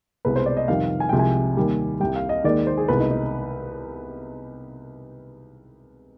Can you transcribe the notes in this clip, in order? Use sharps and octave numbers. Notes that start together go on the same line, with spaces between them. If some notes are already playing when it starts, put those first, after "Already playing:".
C2 B2 G#3 B4
C5
D5
D#5
F2 C3 D#3 G3 F5
G#5
C2 C3 F3 G#3 G5
G#5
D#2 D#3 G3
C2 C3 G3 G5
F5
D#5
D#2 D#3 G#3 D5
C5
G#4
C2 B2 G#3 B4
D#4
D#4